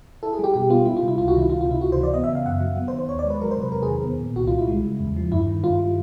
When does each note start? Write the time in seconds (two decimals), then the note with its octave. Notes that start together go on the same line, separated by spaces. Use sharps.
0.23 E4 A4
0.33 G#4
0.39 G3 G4
0.54 B2 G4
0.70 B3 F4
0.86 G3 E4
0.97 F4
1.02 C3
1.08 E4
1.18 C#2 F4
1.28 F#4
1.34 D#3 E4
1.49 C#2 F4
1.61 C3 F4
1.71 E4
1.81 C#2 F#4
1.92 C5
1.97 E3
2.03 D5
2.14 B3 D#5
2.24 E5
2.29 C#3
2.35 F5
2.46 F#2 F#5
2.61 F#3
2.77 B3
2.88 C5
2.93 D#3
2.99 C5
3.08 D#2 C#5
3.19 D5
3.24 G#3
3.30 B4
3.40 F#3 A#4
3.51 C5
3.57 C3 B4
3.72 E2 A#4
3.83 G#4
3.88 D#3
4.04 B3
4.20 A#2
4.36 C2 F#4
4.47 F4
4.52 G3
4.58 E4
4.67 G#3
4.84 C#3
5.00 E2
5.16 F3
5.32 G2 E4
5.47 D#3
5.63 G2 F4
5.79 G3